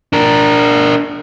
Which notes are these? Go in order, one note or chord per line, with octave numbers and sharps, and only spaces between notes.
D4 A#4